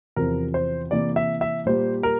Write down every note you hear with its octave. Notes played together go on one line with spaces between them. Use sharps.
E2 C3 F3 C4 A#4
C5
C3 E3 A#3 D5
E5
E5
A#2 G3 A#3 C5
A#4